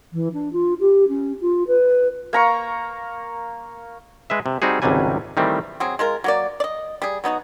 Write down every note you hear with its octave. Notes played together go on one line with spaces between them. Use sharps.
E3
D4
F4
G4
C#4
F4
B4
A#3 A#5 C#6
G#3 B4 E5
C3
G3 C4 D#4 F#4 G#4
G#1 C#2 C3 F#3 G3 G#5
D#3 E3 G3 A3 C4
F#3 C4 G#4
G#3 F4 A#4
F#3 A#3 D5
D5 D#5
G3 G#4
F#3 B3 D#4 F#4